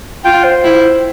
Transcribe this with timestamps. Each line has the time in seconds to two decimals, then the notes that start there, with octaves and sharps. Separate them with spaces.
0.24 F4 G5
0.44 C5
0.64 E4